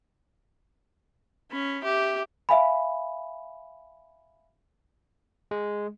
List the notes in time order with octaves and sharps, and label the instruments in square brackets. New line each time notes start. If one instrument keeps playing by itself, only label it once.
[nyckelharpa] C#4 [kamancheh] B5
[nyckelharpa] G4 [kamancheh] E5 D6
[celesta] E5 F5 G#5 B5
[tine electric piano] G#3